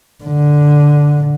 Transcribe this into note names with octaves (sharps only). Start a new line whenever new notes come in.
D3